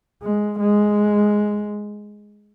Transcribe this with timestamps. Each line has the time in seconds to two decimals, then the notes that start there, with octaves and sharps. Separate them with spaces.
0.22 G#3
0.60 G#3